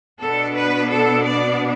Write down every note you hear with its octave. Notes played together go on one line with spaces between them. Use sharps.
B2 B3 D4 A4
B4
A4
D5